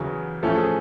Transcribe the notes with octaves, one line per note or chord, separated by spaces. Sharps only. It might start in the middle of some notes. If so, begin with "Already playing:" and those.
Already playing: E2 C#3 F#3 G#4
A2 F3 A3 C#4 A4
G#4